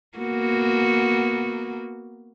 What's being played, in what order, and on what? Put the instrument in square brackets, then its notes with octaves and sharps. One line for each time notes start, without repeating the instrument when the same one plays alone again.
[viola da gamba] A#3 B3 F#4